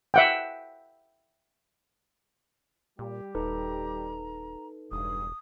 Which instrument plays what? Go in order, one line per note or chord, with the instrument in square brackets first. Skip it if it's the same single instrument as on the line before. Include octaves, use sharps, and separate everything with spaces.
[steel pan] E5 F#5 G5
[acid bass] A#2 [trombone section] G3 G4
[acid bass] D#1 [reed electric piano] D#4 A4 B4 [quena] A#5
[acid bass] E1 [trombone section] G2 [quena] D#6